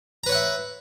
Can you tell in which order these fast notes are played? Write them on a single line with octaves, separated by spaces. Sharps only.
A#5 B4 C#5 F#5 E5